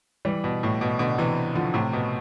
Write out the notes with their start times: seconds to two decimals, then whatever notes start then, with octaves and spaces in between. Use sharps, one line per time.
0.25 E3 G3
0.44 B2
0.63 A2
0.81 B2
0.99 B2 D3
1.18 C3 E3
1.55 D3 F3
1.74 A2 C3
1.93 B2